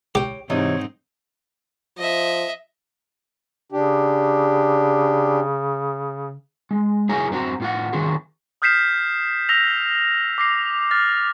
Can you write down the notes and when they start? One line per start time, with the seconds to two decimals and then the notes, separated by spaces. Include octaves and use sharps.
0.15 G4 C#5 G5
0.50 G#2 C3 E3 C4 D#4 C#5 D#5
1.98 F3 D#5 E5
3.72 C#3 D4 G4
6.71 G#3
7.09 F#3 E4 G#4 C#5 G#5 A#5
7.31 F#2 C4 D4 F#4 A#5
7.60 A2 F4 F#5
7.93 D#3 F#3 C#4 F4 G#4
8.62 D#6 F6 G6 B6 C7 E7
9.49 E6 A#6 F7
10.38 D6 A#6 C7
10.91 F6 A6